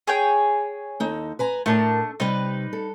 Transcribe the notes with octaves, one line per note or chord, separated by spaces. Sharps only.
G#4 C#5 G5
D#2 D#4 A4
B4 G#5 A#5
A2 A3 D4 E4 A#4 A5
C3 G3 D#4 B4
A4